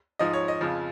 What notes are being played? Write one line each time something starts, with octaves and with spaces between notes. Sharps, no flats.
G#2 F3 D#5
C#5
D#5
F2 C#3 F3